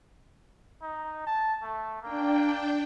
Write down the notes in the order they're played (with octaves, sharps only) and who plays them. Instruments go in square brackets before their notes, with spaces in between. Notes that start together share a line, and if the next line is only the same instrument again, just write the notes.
[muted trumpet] D#4
A5
A3
[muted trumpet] A#3 [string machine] D4 G5